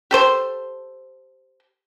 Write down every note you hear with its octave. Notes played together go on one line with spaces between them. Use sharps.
G4 A4 C5 C6